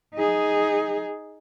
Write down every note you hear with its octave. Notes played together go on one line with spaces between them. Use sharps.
D#4 G#4